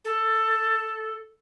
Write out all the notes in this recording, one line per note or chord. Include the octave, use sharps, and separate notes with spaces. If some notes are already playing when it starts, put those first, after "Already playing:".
A4